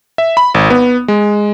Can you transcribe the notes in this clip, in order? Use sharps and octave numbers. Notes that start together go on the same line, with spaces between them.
E5
B5
G#1
B3
G#3